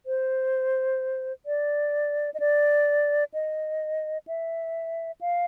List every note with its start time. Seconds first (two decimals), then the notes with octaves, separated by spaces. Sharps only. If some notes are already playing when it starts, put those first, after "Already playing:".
0.06 C5
1.46 D5
2.34 D#5
2.40 D5
3.34 D#5
4.27 E5
5.21 F5